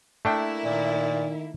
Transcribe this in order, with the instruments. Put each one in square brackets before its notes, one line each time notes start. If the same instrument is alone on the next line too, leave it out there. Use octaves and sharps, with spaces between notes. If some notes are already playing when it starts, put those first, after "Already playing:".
[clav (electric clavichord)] A3 D4 G5 [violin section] A#3 E4
[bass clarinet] A#2 [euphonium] D#3